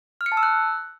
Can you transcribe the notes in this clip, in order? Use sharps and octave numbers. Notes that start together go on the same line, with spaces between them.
F6
C#7
A5
E6
F#6